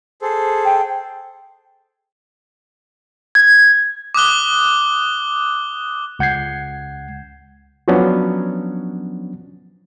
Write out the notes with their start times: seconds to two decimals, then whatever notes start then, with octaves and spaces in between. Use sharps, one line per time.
0.22 G#4 A4 C5
0.65 G5
3.35 G#6
4.15 D6 D#6 F#6 G7
6.19 C#2 F#5 G6 G#6 C7
7.88 F3 F#3 B3 C#4 D4